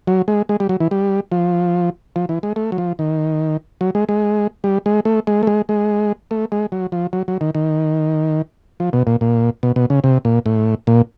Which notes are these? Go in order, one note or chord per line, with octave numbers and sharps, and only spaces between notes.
F#3
G#3
G#3
G3
F#3
E3
G3
F3
F3
E3
G#3
A3
F#3
F3
D#3
F#3
G#3
G#3
G3
G#3
A3
G#3
A3
G#3
G#3
A3
G#3
F#3
F3
F#3
F#3
D#3
D#3
F3
B2
A#2
A#2
B2
B2
C#3
C3
A#2
A2
A#2